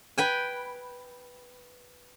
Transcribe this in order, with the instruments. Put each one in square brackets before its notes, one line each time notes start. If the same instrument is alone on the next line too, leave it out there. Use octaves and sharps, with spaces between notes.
[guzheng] B4 G5 G#5